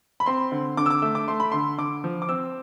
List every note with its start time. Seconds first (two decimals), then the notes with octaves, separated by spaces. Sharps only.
0.20 B5
0.26 C4 C6
0.52 D3
0.77 D3 D6
0.86 E6
0.90 D6
1.02 A3 E6
1.15 D6
1.28 A3 C6
1.40 B5
1.52 D3 C6
1.78 D3 D6
2.04 F3
2.22 D6
2.29 C4 E6